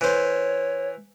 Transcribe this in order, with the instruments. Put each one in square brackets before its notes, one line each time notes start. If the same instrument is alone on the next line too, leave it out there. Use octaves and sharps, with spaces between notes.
[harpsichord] E3 C5 [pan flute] C#5